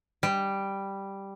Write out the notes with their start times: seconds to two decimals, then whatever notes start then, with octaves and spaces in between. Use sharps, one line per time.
0.23 G3